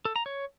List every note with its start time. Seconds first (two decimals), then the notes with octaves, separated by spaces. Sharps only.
0.05 A4
0.16 A#5
0.26 C#5